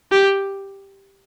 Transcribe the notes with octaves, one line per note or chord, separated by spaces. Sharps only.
G4